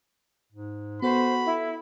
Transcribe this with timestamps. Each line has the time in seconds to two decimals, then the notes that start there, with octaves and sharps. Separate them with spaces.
0.52 G#2
1.02 B3 F#4 A4 C5 B5
1.45 E4